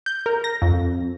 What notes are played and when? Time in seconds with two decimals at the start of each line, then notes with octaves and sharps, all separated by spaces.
0.06 G6
0.26 A#4
0.44 A#6
0.62 F2